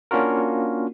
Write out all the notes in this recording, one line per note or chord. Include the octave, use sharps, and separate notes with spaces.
A#3 C#4 D4 F4 F#4 A#4